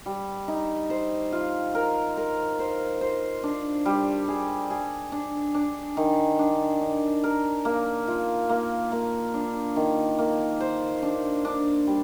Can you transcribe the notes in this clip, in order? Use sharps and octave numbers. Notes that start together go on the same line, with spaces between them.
G3
D#4
C5
F4
A#4
A#4
C5
C5
D4
G3
G#4
G#4
D4
D4
D#3
D4
D4
A#4
A#3
F4
A#3
A#3
D4
D#3
A#3
C5
D4
D4
G3